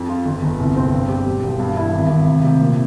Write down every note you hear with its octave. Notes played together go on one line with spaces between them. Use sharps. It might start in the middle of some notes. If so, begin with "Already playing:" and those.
Already playing: F2
F4
G1
G1
C2
C4
G2
G4
E1
E1
G2
E4
G#1
G#1
C3
C3
A#2